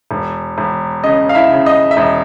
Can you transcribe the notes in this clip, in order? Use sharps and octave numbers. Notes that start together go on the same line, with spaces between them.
E1
E1
C#3 D#5
F5
E4 E5
C#3
D#5
E5
E1 D#5